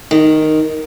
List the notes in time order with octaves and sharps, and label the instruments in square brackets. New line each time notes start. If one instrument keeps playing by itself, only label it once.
[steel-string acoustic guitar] D#3